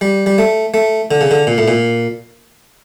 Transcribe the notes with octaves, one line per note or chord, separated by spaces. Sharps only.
G3
G3
A3
A3
D3
C#3
D3
A#2
A2
A#2